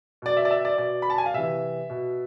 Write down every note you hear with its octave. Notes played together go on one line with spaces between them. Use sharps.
B2 D5
E5
D5
E5
D5
B2 D5
B5
A5
G#5
F5
C3 E3 E5
B2